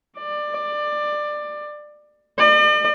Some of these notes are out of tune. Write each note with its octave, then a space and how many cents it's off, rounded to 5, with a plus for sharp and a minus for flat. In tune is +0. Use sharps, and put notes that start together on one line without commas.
D5 +20
D5 +45